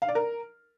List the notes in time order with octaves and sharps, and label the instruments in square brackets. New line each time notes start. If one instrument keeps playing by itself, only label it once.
[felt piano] F5
D5
A#4